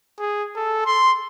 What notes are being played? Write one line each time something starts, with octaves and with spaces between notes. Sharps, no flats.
G#4
A4
C6